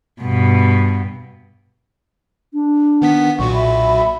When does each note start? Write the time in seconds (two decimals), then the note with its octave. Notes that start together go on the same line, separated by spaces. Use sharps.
0.22 G2 B2
2.53 D4
3.02 D#3 B3 F#5 B6
3.39 B1 A#2 F#4 C#6
3.54 E5 B5